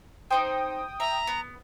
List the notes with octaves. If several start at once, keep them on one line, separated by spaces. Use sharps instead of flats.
C4 D#4 C5 G5 D#6
E5 A#5
B3